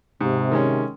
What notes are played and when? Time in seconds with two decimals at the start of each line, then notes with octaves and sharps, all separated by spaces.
0.21 G#2 C3
0.51 D#3 G#3 C#4